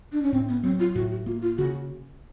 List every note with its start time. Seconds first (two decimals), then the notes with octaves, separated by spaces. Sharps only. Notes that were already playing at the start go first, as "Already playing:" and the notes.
0.12 D4
0.22 C#4
0.32 A2 C4
0.49 B3
0.63 F#3 C4
0.80 F4
0.95 A2 F#4
1.11 F#4
1.26 A#3 F4
1.42 F4
1.57 C#3 F#4